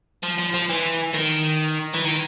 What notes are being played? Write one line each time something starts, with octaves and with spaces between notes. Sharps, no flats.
F3
F3
F3
E3
D#3
E3
D#3